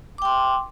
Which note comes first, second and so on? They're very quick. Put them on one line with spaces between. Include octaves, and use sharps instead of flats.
D6 G5 C6